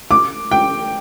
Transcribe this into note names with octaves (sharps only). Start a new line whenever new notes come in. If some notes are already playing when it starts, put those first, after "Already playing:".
D6
G5